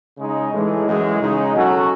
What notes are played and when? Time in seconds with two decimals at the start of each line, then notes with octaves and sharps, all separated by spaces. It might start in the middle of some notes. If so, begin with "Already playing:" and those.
0.18 C#3 G#3 D#4
0.52 A2 E3 G#3
0.87 F#2 E3 G#3
1.20 C#3 G#3 D#4
1.54 B2 F#3 C#4 F#4 A4